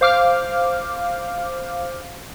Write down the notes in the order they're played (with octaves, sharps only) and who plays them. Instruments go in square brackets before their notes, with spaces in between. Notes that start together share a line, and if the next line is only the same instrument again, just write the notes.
[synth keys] C5 F5 D6 F6